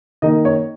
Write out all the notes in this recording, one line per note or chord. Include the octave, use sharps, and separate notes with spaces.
D#3 A#3 D#4 D#5
C#5